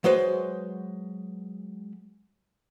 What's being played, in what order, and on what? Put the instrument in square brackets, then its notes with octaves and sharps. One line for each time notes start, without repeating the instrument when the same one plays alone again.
[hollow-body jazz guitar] F#3 G#3 B4 C5